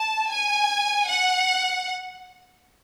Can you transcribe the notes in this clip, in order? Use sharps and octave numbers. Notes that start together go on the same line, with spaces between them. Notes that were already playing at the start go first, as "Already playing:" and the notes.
Already playing: A5
G#5
F#5